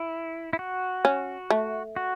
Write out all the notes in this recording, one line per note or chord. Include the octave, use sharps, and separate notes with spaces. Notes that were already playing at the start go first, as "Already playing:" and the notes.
Already playing: E4
E4
F#4
C#4
A3
F#4